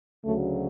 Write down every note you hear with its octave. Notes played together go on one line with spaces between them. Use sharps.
D2 C#3 F#3 A3